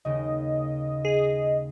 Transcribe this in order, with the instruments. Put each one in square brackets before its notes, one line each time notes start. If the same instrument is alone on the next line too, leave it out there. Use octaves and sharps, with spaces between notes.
[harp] D#2 C#3 [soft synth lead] D#5
[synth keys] G#4